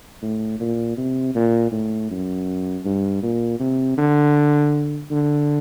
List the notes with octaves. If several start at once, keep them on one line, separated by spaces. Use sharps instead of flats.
A2
A#2
C3
A#2
A2
F#2
G2
A#2
C3
D3
D3